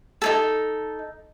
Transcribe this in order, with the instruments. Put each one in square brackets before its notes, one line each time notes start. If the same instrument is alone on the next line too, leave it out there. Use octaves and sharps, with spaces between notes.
[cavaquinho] D#4 G#4 A4